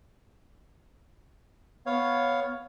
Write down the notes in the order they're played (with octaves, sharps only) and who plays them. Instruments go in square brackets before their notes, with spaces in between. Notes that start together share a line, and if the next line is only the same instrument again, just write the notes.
[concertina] B3 C#5 F5